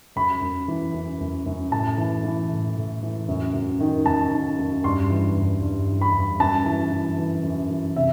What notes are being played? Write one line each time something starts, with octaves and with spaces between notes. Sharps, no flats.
F#2 B5
F#2
E3
F#2
F#2
F#2
A2 A5
E3
E3
A2
A2
E3
F#2
F#2
D#3
F#2 A5
D#3
F#2
G2 C6
E3
G2
G2
E3
B5
G2
F#2 A5
E3
E3
E3
F#2
E3
C3 E5